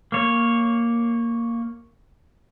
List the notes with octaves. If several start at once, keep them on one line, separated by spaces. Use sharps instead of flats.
A#3 C#5